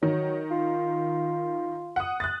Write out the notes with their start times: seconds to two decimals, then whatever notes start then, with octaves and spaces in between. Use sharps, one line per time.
0.03 D#3 F#3
0.51 F4
1.96 F#5 D#6
2.20 F#6 A6